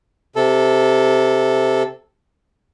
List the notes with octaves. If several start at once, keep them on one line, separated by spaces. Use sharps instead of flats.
C3 A4